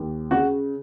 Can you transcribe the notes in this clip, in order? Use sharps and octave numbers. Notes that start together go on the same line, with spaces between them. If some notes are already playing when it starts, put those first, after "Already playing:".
Already playing: D#2
C#3 F#4